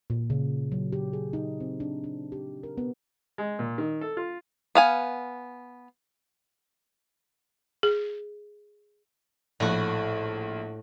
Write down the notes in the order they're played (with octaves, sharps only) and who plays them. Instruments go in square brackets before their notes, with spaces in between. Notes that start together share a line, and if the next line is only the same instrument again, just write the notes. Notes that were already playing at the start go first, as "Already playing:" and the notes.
[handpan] A#2
C#3
F#3
G4
G#4
D#4
C4
D4
D4
G4
A#4
B3
[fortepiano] G#3
A#2
D#3
A4
F4
[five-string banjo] B3 F5 G#5
[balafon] G#4
[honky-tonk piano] A#1 [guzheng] A2 F#4